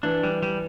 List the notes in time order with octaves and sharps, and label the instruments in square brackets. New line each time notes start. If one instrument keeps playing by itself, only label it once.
[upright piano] E3 [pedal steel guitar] D4
[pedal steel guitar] G3
G3